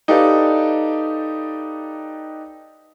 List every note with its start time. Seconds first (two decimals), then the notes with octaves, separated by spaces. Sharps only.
0.08 D#4 G4 A4 B4 D5 F5